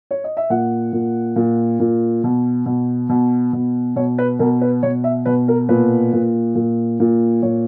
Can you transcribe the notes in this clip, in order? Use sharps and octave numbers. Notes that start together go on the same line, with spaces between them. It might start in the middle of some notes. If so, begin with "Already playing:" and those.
C#5
D#5
E5
A#2 F#5
A#2
A#2
A#2
B2
B2
B2
B2
B2 C#5
B4
B2 A#4
B4
B2 C#5
E5
B2 B4
A#4
A#2 B4
A#2
A#2
A#2
A#2 C#5